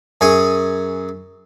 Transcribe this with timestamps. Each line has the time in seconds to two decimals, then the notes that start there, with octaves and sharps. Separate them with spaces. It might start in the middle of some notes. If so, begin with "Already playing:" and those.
0.21 F#2 G#4 G#5 C#6 D#6